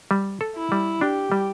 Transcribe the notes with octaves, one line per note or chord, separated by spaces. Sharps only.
G3
A4
E4
G3
D4 G4
G3